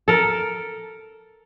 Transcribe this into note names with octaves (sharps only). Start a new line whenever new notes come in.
A4 A#4